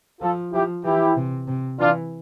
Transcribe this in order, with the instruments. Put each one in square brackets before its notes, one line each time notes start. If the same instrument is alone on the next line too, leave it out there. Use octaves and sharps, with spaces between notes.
[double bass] F3 [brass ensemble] F4 A4
[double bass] F3 [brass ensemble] E4 G4
[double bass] E3 [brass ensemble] E4 G4
[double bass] C3
C3
[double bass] E3 [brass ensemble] D4 F4